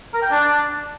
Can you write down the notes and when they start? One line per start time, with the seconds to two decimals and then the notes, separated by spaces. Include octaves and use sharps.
0.14 A#4
0.23 G5
0.31 D4